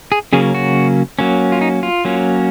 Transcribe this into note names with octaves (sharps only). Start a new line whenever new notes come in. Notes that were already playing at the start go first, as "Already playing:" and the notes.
G#4
C#3 F#3 A#3 C#4 G#4
F#4
F#3 A#3 C#4
F4
D#4
F4
F#3 A#3 C#4